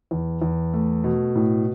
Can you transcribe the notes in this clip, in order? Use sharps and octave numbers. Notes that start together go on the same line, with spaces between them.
E2
E2
A3
B2
A2